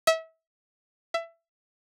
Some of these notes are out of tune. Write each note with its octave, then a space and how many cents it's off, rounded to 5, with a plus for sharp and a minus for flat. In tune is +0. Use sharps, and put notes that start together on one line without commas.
E5 -30
E5 +20